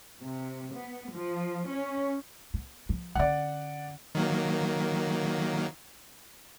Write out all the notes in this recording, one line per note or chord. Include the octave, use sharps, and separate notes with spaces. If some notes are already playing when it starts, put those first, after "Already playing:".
C3
B3
F3
C#4
B3
F3
D3 C#4 D5 F#5
D#3 F#3 A#3